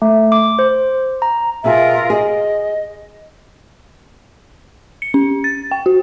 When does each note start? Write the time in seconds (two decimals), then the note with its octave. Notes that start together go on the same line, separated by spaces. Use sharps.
0.02 A3
0.32 D6
0.59 C5
1.22 A#5
1.64 B2 F4 G#4 A#4 E5
2.10 G#4 D#5
5.02 C#7
5.14 C#4
5.44 A6
5.71 G5
5.86 F#4